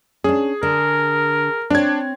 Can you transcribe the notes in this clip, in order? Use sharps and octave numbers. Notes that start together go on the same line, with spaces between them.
C#4 D4 G#4
D3 A#4
C4 D4 C#5 G#6